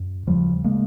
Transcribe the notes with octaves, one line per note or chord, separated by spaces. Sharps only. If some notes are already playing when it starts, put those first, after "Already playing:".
Already playing: F#2
D#2 C#3 F3 G3
C#3 G#3 A#3